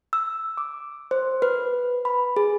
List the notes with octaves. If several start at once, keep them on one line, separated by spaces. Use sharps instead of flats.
E6
D6
C5
B4
B5
G#4